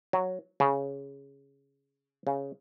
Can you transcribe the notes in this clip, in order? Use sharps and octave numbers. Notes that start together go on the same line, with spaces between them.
F#3
C#3
C#3